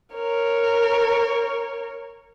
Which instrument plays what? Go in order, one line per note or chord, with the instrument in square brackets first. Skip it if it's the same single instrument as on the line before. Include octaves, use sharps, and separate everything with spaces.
[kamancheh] A#4 C#5